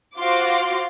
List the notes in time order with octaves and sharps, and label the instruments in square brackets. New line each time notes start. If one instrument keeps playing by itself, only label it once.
[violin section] F4 F#4 C5 F5 C6 D6